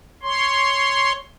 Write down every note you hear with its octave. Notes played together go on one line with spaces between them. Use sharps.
C#5 C6